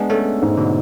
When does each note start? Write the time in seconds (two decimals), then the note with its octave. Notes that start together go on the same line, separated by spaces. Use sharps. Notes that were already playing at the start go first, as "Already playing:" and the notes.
Already playing: G#3 B3 D4
0.10 A3 C#4 A4
0.42 G#2
0.57 B2 D3